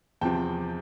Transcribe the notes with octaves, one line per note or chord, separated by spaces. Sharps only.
E2 C3 F3 G5 A5